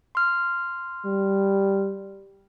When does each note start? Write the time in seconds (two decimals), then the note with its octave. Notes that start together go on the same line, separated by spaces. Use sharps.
0.15 C6 F6
1.05 G3